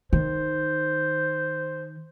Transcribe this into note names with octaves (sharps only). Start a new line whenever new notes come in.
D#3 C5